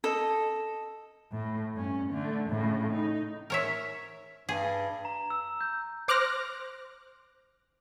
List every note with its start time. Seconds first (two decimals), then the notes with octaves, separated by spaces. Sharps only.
0.04 A4 D#5
1.32 A2
1.74 G2 C#4
2.11 D3 A3
2.50 A2 C#3
2.90 D#4
3.50 A#4 C#5 E5
4.49 G2 G#4
5.05 A#5
5.30 E6
5.61 G6
6.08 C5 D6 F6 F#6 A#6